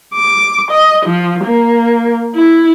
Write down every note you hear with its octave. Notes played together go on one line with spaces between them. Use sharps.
D6
D#5
F3
A#3
E4